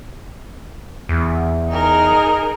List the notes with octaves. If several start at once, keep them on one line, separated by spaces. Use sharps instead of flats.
E2
D#4 G#4 A#4